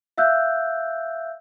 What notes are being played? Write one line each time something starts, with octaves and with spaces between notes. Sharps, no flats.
E5 F5 E6 F#6 G6